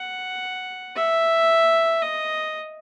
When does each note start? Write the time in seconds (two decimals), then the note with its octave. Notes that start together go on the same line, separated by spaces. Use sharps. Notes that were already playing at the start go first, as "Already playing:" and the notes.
Already playing: F#5
0.96 E5
2.02 D#5